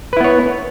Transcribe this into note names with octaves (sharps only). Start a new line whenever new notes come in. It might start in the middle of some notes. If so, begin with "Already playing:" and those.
B3 E4 B4 C#5